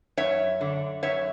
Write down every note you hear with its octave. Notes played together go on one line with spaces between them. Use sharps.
F#2 C#5 E5
D3
F#2 C#5 E5